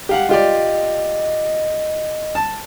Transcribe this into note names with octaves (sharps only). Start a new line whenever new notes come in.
G4 F5 F#5
F4 G4 D5 D#5
A5